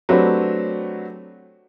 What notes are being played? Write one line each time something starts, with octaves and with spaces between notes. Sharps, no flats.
F#3 A3 C4 D4 G4 B4